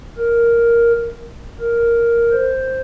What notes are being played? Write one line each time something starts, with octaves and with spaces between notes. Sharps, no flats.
A#4
A#4
C5